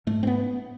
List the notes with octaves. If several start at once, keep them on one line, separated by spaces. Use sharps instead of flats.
G#2 A3
C4
B3